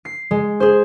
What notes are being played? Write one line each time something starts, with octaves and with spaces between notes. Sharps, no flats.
C7
G#3
G#4 C5